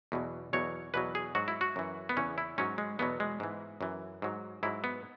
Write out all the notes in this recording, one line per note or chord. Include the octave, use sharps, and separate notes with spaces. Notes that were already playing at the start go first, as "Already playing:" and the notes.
E2 B2 F#3
E2 B2 F#3 C#5
E2 B2 F#3 B4
G#4
G#2 F#3 F#4
E4
F#4
F#2 E3
B3
E2 C#3 E3 C#4
E4
G#2 F#3 C#4
G#3
E2 B2 F#3 B3
G#3
G#2 E3
F#2 E3
G#2 F#3
G#2 F#3 E4
B3